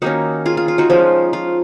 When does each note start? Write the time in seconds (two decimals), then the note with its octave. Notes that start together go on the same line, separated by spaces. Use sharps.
0.02 D#3 A#3 C#4 D#4 F#4
0.46 F4 G#4
0.57 F4
0.68 F4
0.78 D#4 F#4
0.90 F3 G#3 C#4 F4
1.33 F4